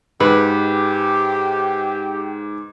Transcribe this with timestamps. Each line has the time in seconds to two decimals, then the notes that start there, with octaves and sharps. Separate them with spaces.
0.20 G#2 G#3 G4 B4